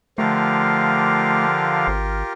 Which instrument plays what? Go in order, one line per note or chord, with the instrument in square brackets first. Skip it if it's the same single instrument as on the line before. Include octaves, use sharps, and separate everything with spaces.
[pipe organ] D3 F3 F5 [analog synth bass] A3 [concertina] F4 G4 A#4
[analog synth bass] G#1